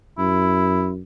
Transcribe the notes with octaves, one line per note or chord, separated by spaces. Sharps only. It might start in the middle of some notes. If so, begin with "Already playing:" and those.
F#2 E4